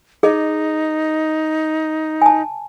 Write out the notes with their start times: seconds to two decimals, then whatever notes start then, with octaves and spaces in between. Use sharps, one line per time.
0.23 D#4 G#4 D#5
2.22 G#5 A5